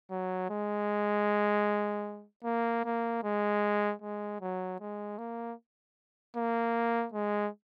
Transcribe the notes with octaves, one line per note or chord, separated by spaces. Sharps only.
F#3
G#3
A#3
A#3
G#3
G#3
F#3
G#3
A#3
A#3
G#3